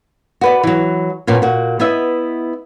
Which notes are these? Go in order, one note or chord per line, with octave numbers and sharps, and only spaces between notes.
F#4 B4 D5
E3 F#3
F2 A#2 A#3 B3 C#4
A#2 F#4
B3 E4 D#5 E5